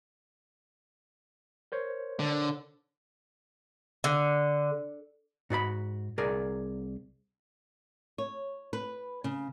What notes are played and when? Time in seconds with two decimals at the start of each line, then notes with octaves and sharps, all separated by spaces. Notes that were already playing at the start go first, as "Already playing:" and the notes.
1.72 A#4 C5 C#5
2.19 D3
4.04 D3
5.50 G#2 F#4 D5 B5
6.18 C2 G#4 A#4 D5
8.18 C#5
8.73 B4
9.24 C#3